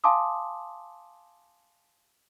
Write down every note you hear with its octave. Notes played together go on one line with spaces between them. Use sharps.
F5 G#5 A5 C6 D6 D#6